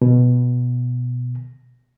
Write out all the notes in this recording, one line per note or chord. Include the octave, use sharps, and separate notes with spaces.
B2